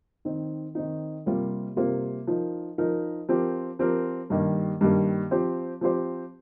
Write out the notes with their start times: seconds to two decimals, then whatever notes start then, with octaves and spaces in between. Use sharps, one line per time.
0.25 D#3 C4 D#4
0.75 D#3 C4 D#4
1.26 C3 G3 A#3 F4 C5
1.76 C3 G3 A#3 F4 C5
2.27 F3 D#4 A#4
2.78 F3 D#4 A#4
3.29 F3 C4 G4 A#4
3.79 F3 C4 G4 A#4
4.30 G2 D#3 G3 A#3
4.81 G2 D#3 G3 A#3
5.31 F3 C4 G4 C5
5.81 F3 C4 G4 C5